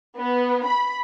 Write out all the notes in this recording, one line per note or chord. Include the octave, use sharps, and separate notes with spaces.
B3
B5